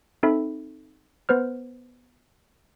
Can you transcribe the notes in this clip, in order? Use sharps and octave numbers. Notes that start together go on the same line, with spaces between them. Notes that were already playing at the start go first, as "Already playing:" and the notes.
C4 D#4 A4 E5 B5
B3 B4 C5 F6